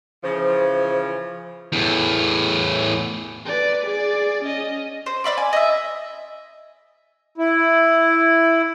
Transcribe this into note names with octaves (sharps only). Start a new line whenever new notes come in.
C#3 E3 F3 C5
E2 A2
B4 D5
G#4 D5
C#4 D#5
C5
D5 E5 B5 D6
G#5
D#5 E5
E4